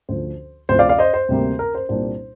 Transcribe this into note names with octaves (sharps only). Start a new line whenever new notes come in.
D2 D3 F3 C5
D2 C3 F3 C5
D5 F5
D5 F5
C5 D#5
C5
D2 C3 G3 A#3
A#4
C5
C2 A#2 G3 A#3 D4 C5